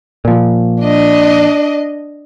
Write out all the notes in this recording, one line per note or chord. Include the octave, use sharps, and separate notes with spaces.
A#2 F3
D4 D#5